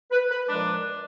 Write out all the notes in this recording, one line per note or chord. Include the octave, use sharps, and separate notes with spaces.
B4
B4
A#2 F3 G#3 D4